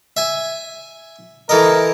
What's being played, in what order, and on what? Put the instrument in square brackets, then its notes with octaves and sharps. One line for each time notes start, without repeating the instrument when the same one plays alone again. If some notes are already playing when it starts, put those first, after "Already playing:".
[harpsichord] E5 G#5
[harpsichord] E3 A4 D#5 [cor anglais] A#4